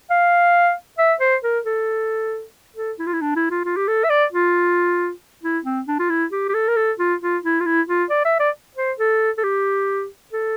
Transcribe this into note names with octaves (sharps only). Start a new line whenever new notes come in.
F5
E5
C5
A#4
A4
A4
E4
F4
E4
D4
E4
F4
F4
G4
A4
E5
D5
F4
E4
C4
D4
F4
E4
G4
G4
A4
A#4
A4
F4
F4
E4
F4
E4
F4
D5
E5
D5
C5
A4
A4
G4
A4